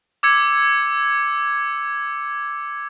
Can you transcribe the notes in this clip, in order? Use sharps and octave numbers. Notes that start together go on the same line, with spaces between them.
D6 E6 G#6 C#7